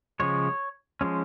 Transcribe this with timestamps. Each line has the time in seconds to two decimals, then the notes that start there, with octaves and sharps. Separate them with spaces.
0.20 C#3 F3 G#3 C#5
1.01 F3 G#3 C#4